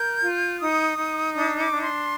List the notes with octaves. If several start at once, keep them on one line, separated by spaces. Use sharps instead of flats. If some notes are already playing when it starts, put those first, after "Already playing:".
Already playing: A#4 G6
F4
D#4 D#6
D#4
D4 D#6
D6
D4
C6